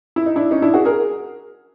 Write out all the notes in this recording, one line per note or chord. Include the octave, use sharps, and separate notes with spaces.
E4
D#4
D4 E4
C#4 D#4
D4 E4
F#4 G#4
G#4 A#4